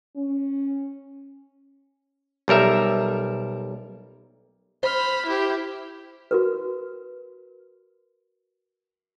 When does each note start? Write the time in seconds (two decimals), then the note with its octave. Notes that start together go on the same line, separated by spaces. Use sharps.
0.17 C#4
2.48 B1 G3 A#4 E5
4.83 C5 B5 F6
5.26 E4 G4
6.31 F#4 A#4 B4